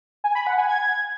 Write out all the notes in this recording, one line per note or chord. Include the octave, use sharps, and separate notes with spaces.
G#5
B5
F#5
G#5
G#6